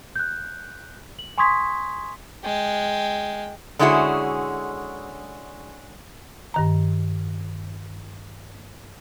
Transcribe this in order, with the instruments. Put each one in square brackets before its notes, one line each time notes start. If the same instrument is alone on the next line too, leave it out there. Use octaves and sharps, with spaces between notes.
[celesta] F#6 G6
F#7
G#5 C6 C#6 D#6 G#6 B6
[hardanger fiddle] G#3 G5
[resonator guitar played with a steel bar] D3 G#3 C#4 E4 F#4 G#4
[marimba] G2 D#3 A#5